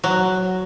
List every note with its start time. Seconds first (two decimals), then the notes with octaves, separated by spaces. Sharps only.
0.04 F#3